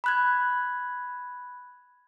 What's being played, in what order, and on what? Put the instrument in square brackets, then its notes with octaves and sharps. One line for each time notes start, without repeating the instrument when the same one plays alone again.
[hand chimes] B5 F#6 G#6